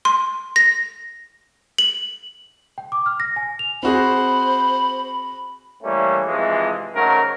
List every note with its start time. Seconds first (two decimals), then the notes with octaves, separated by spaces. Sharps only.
0.05 C6
0.56 A#6
1.78 F#7
2.78 G5
2.92 D6
3.06 F6
3.20 A#6
3.36 G#5
3.59 F7
3.83 C4 F#4 G#4 C5 B5
5.83 E3 G3 A3 A#3 C#4
6.27 C3 E3 F3 G#3
6.95 G#2 C#3 F#3 A3 A#4